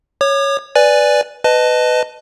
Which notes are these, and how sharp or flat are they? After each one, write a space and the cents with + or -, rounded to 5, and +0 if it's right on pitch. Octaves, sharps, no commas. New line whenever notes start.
C#5 +0 D6 +45
B4 +0 D5 +0 G#5 +0
B4 +20 D#5 -10 A5 +0